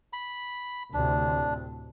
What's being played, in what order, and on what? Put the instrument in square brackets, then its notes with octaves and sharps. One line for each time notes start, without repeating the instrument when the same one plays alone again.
[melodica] B5
[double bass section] D2 A2 C3 [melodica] D4